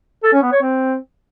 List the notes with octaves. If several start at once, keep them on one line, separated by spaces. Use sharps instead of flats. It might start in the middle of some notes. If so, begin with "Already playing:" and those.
A4
C#4
B3
C#5
C4